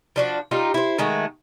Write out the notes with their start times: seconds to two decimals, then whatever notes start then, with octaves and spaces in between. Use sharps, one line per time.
0.16 F3 D4 F#4
0.51 G3 D#4 F4
0.74 E4 C5
0.98 D#3 G#3 A3 F#4